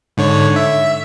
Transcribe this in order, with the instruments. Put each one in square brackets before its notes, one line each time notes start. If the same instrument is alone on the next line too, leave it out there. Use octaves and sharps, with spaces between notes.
[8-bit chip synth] G#2 D3 C#5
E5